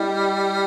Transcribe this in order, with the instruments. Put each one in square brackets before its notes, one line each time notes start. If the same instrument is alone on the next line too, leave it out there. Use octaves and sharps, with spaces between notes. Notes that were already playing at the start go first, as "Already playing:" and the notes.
Already playing: [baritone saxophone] G3 [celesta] E4 D#5